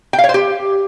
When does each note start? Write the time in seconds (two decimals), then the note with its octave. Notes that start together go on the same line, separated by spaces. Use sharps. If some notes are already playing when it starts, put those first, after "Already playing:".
0.13 G5
0.18 F5
0.24 C#5
0.29 C5
0.34 G4